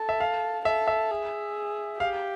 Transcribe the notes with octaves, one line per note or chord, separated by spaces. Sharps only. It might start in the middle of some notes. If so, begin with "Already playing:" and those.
Already playing: A4
E5
F5
A4 E5
E5
G#4
G4 F5